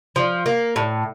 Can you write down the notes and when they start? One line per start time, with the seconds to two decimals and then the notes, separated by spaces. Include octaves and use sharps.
0.16 F3
0.46 A#3
0.76 A2